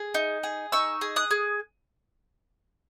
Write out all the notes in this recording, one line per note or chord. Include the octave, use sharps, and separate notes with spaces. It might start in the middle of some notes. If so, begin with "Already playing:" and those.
Already playing: G#4
D#4
G#4
D#4 C#6 E6
G#4
D#6 F#6
G#4